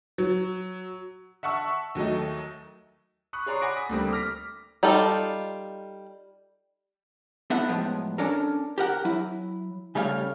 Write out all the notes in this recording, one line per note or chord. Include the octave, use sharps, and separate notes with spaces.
F#3
E5 F#5 A5 C#6 E6
D#2 F#3 A3 D#5
B5 C#6 D#6 F#6
G#4 C#5 D5 A#5 C6 C#6
F#5 G#5 B5 D6 A#6 D7
D#6 B6
D2 D3 G3 A3 A#3 C4
D6 F6 A#6 B6
G3 D#4 F4 A4 D5
B3 D#4 E4 A4 E5 F#5
A2 F3 F#3 G#3 B3
C#4 D4 A4 A#4
G4 A#4 F#5
F#3 E4
C#3 G3 A3 C#5 E5 F5